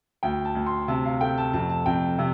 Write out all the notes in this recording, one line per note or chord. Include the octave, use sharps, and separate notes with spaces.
D2 G5
A5
D2
C6
C3 A5
F5
A3 G5
A5
F2 A5
A5
F2 G5
C3